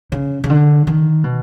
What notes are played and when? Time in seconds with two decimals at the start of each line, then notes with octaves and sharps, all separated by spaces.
0.12 C#3
0.44 C#3
0.50 D3
0.87 D#3
1.24 B2